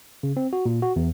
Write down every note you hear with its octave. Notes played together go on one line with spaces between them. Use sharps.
C#3
C4
F#4
A#2
F#4
E2